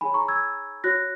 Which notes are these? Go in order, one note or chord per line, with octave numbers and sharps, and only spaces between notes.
D#4 G#4 C#5 G#5 B5
A#5 C#6
E6 G#6
F#4 C#5 F#6 A#6